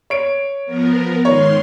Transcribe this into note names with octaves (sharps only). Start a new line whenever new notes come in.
C#5 D7
F3 B3 A#4
G#2 D#3 C#5 C6